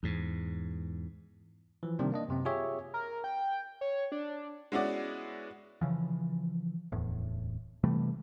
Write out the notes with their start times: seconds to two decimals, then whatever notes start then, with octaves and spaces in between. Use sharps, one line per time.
0.03 E2 G#2
1.83 E3 F3
1.99 C3 D#3 G3 A#3 C4 D4
2.12 A#3 D4 D#5
2.28 F#2 C3 C4
2.45 F4 G4 G#4 C#5 E5
2.94 A#4
3.24 G5
3.81 C#5
4.12 D4
4.72 G#3 B3 C#4 E4 F#4 D5
5.81 C#3 E3 F3
6.92 D1 E2 A2
7.84 C3 E3 G3 A3